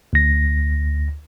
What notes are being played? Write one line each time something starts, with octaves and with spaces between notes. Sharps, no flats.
D2 A#6